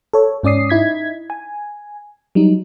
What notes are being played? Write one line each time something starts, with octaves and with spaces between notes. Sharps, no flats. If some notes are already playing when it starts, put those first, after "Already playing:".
A4 C#5
G#2 C#4 D5 D#6 C7
D#4 E4 G#6 B6
G#5
F#3 G3 D#4